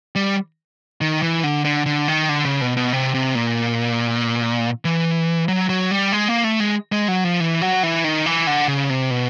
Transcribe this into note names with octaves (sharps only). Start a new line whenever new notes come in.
G3
D#3
E3
D3
D3
D3
D#3
D3
C#3
B2
B2
C3
C3
A#2
E3
F#3
F#3
G3
G#3
A#3
A3
G#3
G#3
F#3
F3
E3
F#3
E3
D#3
E3
D3
C#3
C3
B2